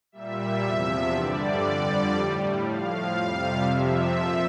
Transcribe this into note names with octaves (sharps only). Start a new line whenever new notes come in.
A#2 G3 E5
E2 C3 F3
G2 D3 G3 D5
F2 D3 G3
A2 G3
A2 F3 F5
F2 C3 G3
F2 C3 F3 E5
A#2 F3